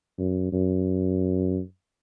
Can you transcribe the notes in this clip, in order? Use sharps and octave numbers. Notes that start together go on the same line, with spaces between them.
F#2
F#2